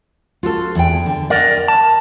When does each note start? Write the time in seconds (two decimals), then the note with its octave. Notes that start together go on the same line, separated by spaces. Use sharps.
0.43 F4 F#4 A4
0.75 E2 G5
1.06 D3
1.30 A#4 D5 F#5
1.68 A5